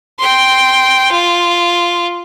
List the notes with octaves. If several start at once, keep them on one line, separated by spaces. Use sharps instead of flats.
G5 C6
F4